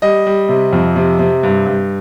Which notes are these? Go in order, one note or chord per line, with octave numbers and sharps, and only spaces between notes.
G3 D#5
G3
C3
F2
C3
C3
G2
G2